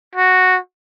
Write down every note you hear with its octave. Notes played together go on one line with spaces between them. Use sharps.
F#4